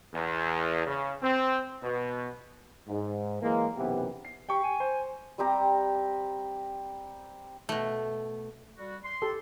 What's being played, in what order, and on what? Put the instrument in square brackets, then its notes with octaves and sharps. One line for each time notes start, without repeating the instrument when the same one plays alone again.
[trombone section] E2
C#3
C4
B2
G#2
E3 F#3 G#3 A#3
B1 F#2 C3 E3 B3 G4
[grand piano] C7
[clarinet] G4 [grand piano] G5 C#6
[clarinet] G#5
[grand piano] C5
[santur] G3 C4 G4 A#5
[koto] B2 A3
[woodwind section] G3 F#4
C6
[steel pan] G4 A4